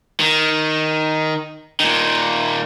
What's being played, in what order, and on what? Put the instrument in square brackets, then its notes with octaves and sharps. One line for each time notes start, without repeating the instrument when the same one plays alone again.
[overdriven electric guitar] D#3
A#2 D#3